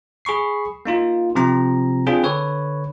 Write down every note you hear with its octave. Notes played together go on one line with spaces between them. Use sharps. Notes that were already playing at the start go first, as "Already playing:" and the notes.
G#4 B5 C#6 C7
A#3 D#4 F4
C3 F3 C4 A#5
C4 D4 F4 G#4 G5
D3 B4 C#5